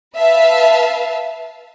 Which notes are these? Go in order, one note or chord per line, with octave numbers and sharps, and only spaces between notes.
B4 E5 F5 A5